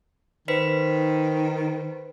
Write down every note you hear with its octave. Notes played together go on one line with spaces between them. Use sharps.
D#3 B4 C5 B6